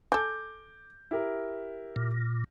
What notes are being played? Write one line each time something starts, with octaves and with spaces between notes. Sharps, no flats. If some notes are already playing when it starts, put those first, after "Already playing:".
A4 G#5 D6 G6
E4 G4 A#4
A#2